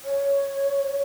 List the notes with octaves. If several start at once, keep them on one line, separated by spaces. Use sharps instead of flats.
C#5